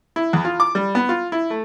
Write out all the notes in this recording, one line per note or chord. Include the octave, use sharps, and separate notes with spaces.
E4
E2
F4
D6
G3
B3
F4
E4
A3